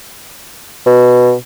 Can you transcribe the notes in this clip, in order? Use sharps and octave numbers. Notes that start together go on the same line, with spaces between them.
B2